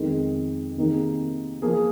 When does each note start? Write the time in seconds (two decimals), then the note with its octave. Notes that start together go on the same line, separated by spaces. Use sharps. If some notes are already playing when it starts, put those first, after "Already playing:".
Already playing: F2 D#3 G#3
0.77 C3 D#3 A#3 D#4 G#4
1.62 F3 A#3 G#4